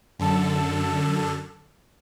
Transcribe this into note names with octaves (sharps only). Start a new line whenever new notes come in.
F#2 D3 A4